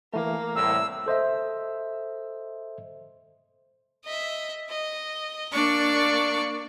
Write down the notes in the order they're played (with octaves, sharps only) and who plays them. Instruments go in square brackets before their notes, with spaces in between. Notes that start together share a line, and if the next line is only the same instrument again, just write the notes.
[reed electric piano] E3 A3 [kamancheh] A#3
[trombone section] C2 A2 [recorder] E6
[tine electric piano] A4 C5 D#5 E5
[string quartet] D#5 E5
D#5
A#3 D4 D5 C#6